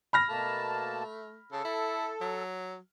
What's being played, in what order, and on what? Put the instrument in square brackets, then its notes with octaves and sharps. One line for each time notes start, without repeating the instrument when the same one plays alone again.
[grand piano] B5 F6 A#6
[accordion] B2 A#3 A5 [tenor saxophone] A3
[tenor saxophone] C#3 [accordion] A4
[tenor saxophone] E4
F#3